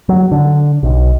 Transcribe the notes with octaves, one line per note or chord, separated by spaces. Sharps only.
F#3
D3
B1